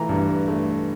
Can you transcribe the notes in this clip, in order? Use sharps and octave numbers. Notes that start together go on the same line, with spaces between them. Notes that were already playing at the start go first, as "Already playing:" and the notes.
Already playing: E3 A3 A#5
G2
A3